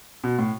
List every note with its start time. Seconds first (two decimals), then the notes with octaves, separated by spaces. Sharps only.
0.24 B2
0.39 A2